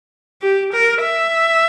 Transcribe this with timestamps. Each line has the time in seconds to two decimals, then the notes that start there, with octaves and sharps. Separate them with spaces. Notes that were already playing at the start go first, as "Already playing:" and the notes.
0.42 G4
0.73 A#4
1.02 E5